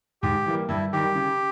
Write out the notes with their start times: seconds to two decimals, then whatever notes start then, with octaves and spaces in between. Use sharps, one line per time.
0.22 G#2 G4
0.46 E3 G3 A#3
0.69 G2 E4
0.93 D#3 G3 G4
1.15 C#3